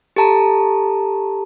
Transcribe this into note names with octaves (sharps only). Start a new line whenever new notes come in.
G4 A4 A5 A#5